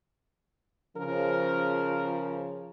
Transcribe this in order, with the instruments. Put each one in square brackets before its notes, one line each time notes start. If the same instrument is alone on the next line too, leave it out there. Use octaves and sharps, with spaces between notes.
[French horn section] C#3 F3 [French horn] A#4